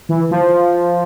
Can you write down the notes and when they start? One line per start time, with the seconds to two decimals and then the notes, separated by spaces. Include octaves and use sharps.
0.09 E3
0.31 F3